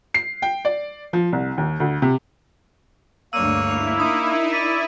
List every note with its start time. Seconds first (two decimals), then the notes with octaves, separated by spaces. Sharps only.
0.14 C7
0.42 G5
0.65 D5
1.13 F3
1.32 C2
1.58 D#2
1.80 D2
2.02 C3
3.33 D2 G2 A#3 C#5 E6 D#7
3.69 E4 F7
4.00 D4 D#4 A#4 D#6
4.53 D5 B6 D#7